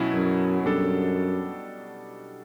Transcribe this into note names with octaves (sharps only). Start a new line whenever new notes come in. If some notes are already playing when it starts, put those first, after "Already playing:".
Already playing: B2 F#3 C#4 E4
F#2
F#2 B2 G3 D4 A4